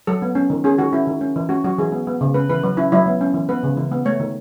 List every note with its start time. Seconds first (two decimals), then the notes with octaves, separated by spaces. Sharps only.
0.07 F#3 A4
0.22 B3
0.35 C#4
0.50 D#3
0.64 C#4 G#4
0.78 D#3 F#4
0.93 C#4 E4
1.07 D#3
1.21 C#4
1.36 E3
1.49 C#4 F#4
1.64 F#3 F#4
1.78 E3 G#4
1.92 B3
2.07 B3
2.21 C#3
2.34 C#4 B4
2.50 E3 B4
2.63 F#3 B4
2.77 C#4 E4
2.92 F#3 E4
3.06 B3
3.21 C#4
3.34 E3
3.49 B3 B4
3.63 C#3
3.77 E3
3.92 B3
4.05 A3 C#5
4.20 D#3